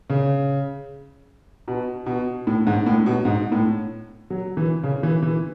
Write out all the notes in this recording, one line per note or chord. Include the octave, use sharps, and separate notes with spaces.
C#3
B2
B2
A2
G#2
A2
B2
G#2
A2
F#3
E3
C#3
E3
E3